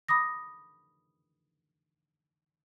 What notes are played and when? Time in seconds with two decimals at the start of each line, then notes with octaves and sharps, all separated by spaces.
0.08 B5 D6 D#6 A#6